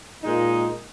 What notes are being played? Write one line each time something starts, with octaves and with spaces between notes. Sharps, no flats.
A#2 G#3 D#4